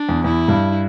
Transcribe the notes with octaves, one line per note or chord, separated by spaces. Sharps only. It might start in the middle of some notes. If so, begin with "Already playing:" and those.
Already playing: D4
E2
E2 E4
G2